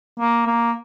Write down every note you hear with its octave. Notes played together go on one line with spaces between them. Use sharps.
A#3
A#3